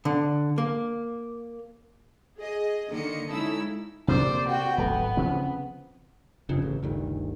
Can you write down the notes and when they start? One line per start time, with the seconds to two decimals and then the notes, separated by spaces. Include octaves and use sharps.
0.05 D3
0.58 A#3
2.37 G#4 D#5
2.89 D3 D#3 A#3 D#5 C#7
3.29 C#3 G#3 D#4 E4 A4 E6
4.08 C3 A#3 C5 D5
4.49 F#4 G5
4.78 D1 G#1 A3 B3
5.17 C#3 F3 C4
6.49 G1 F2 C#3
6.62 A1
6.82 G1 D2 D#3